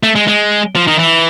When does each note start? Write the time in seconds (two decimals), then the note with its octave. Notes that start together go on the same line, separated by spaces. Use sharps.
0.03 A3
0.16 G#3
0.28 G#3
0.76 F3
0.87 D#3
0.99 E3